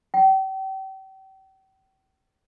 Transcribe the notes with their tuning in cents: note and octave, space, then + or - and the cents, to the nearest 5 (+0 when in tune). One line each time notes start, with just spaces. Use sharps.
G5 -35